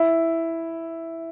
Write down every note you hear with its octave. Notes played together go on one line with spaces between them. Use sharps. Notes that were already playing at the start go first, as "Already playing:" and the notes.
Already playing: E4